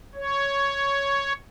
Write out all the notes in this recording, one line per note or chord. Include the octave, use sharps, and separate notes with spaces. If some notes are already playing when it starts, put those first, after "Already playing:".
C#5